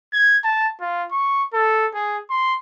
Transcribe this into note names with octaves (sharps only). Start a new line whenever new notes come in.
G#6
A5
F4
C#6
A4
G#4
C6